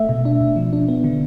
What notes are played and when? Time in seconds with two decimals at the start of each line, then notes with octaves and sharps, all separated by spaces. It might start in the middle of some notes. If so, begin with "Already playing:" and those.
Already playing: A3 E5
0.09 B2
0.25 D4
0.41 B2
0.56 F3
0.73 D4
0.89 B3
1.04 D3